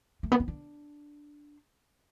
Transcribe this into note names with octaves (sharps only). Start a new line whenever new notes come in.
A3
B3
C4
D4